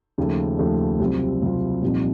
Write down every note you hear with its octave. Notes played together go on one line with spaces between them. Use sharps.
D#2 C#3 F3 A3
D#2 C#3 F3 A3
C2 C3 F#3 C4 F4
C2 C3 F#3 C4 F4
C2 A#2 F3 C4 D#4